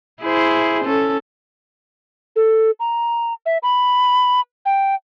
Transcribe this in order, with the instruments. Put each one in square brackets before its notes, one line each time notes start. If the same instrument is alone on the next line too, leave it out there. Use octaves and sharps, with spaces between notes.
[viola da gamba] E4 G#4 C5
C#4 A4
[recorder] A4
A#5
E5
B5
G5